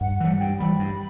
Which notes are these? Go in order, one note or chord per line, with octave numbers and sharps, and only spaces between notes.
G2 F#5
E3 G3 F#5
G2 G5
E3 G3 B5
G2